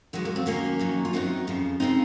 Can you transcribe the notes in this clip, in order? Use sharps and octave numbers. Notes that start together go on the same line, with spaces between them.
D#2 D#3 F#3 G#3
A#3
C4
D#2 D#3 F#3 A#3 C#4
F#2 D#3 F#3
F4
F#2 D#3 F#3 C4 D#4
F2 C#3 F3
C#3 F3 C4 D#4